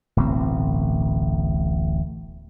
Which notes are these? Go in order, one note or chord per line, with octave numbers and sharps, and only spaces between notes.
D1 A1 B2 C4